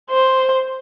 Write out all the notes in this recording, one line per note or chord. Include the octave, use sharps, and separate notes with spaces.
C5